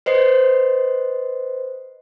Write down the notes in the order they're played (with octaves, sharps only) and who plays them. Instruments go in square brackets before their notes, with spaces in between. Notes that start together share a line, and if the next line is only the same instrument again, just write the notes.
[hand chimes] B4 C5 D#5 C7